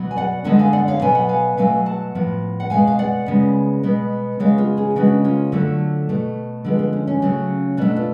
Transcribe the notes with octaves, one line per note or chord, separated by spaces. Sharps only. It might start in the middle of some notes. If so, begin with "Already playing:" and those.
Already playing: B2 F#3 B3
G#5
D5 F#5
D3 G#3 B3 F#5 A5
F5 G#5
D5 F#5
C#5 F5
B2 F#3 B3 G#5
F#5
F5 G#5
B2 F#3 A3 F5 G#5
F#5 A5
A2 F3 B3
F#5
B2 G#3 B3 F5 G#5
F5
D5 F#5
C#3 G#3 B3
B2 G#3 B3
C#3 G#3 B3 C#5 F5
F4 G#4
F4 G#4
C#3 G#3 B3 D4 F#4
C#4 F4
D3 F#3 A3
B2 A3
D3 F3 G#3 B3
B3
C#4
C#4
C#3 F#3 A3
B2 A3 B3 D4
F4